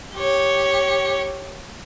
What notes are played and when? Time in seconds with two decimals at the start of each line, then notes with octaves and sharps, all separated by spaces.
0.14 G4 C#5